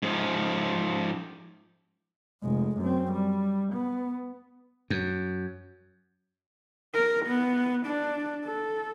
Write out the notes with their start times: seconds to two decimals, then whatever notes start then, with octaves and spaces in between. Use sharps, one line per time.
0.02 G#2 F3
2.42 F1 G#3
2.79 F#2 C4
3.12 G3
3.73 B3
4.90 F#2
6.94 A#4
7.26 B3
7.86 D4
8.45 A4